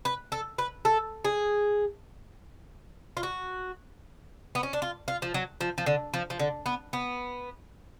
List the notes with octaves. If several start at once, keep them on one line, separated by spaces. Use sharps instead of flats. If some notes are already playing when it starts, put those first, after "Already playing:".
B4
A4
B4
A4
G#4
F4
F#4
B3
C#4
D4
F4
F4
F3
F#3
F3
F3
D3
F3
F3
D3
B3
B3